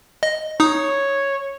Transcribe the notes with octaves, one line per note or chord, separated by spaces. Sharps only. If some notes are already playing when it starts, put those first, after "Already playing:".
D#5
D#4 C#5 D#6